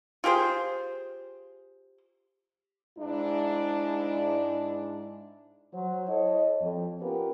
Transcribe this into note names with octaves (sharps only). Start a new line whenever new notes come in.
F4 G4 G#4 C5
G#2 D4 E4
F#3 C5
E4 A4 C#5 D#5
F2
B3 C#4 F4 G4 A#4 B4